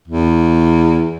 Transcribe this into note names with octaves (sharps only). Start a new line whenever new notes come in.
E2